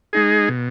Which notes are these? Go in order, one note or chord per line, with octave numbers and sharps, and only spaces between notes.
G#3 D#4 G#4
B2